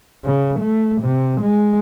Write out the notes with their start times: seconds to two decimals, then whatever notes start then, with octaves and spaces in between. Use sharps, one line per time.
0.25 C#3
0.60 A3
1.02 C3
1.41 G#3